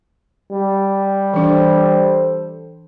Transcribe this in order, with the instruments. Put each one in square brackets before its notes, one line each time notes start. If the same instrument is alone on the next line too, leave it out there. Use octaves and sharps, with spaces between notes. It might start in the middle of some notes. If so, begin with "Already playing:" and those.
[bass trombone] G3
[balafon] E3 D4 [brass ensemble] A4 C5